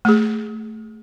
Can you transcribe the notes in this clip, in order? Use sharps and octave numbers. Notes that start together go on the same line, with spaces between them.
A3 G#4